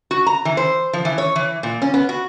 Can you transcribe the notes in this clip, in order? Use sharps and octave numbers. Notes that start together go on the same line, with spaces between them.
F#4
A#5
E3
C5
F3
E3
C#5
E3
A#2
C#4
B3
F#4